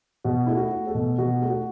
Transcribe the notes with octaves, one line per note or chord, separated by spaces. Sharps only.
B2 F#4
A3 E4
F#4
A3
A4
B2
B2 F#4
A3
F#4